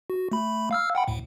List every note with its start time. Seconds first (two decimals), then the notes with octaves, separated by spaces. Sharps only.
0.10 F#4
0.32 A3 B5
0.71 F5 E6 F6
0.95 F#5 G5 B5
1.08 D2 A2